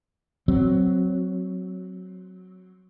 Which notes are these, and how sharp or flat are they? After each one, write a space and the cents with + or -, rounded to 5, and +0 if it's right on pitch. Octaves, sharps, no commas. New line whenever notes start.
F#3 +0 C4 +0